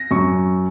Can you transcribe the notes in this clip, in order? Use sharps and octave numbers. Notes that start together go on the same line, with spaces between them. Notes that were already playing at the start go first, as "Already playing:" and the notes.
Already playing: A#6
F#2 C#6